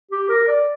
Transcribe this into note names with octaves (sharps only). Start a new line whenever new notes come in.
G4
A#4
D5